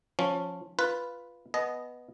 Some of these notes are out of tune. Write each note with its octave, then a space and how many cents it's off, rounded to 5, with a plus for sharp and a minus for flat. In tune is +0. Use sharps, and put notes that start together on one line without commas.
F3 +20 C#4 +0
F4 -5 B4 +0
B3 +0 D#5 +0 A5 -45